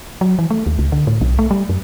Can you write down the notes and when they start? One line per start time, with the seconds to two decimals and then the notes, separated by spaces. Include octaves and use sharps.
0.21 F#3
0.39 E3
0.50 A3
0.66 D#2
0.79 C#2
0.92 D3
1.07 A2
1.21 B1
1.39 A3
1.51 G3
1.69 F#2